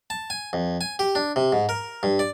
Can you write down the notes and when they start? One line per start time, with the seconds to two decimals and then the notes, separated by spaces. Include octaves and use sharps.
0.10 A5
0.30 G#5
0.53 F2
0.81 G#5
0.99 G4
1.15 D4
1.36 C3
1.52 G#2
1.69 A#4
2.03 G2
2.19 D5